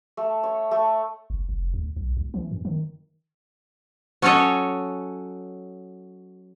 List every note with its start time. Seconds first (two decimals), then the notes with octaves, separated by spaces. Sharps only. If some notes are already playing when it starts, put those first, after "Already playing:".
0.17 A3
0.43 C#5
0.71 A3
1.30 F#1
1.49 F1
1.74 D2
1.96 B1
2.17 C#2
2.34 E3
2.51 F#2
2.65 D#3
4.22 F#3 C#4 F#4 A4 C#5 D#5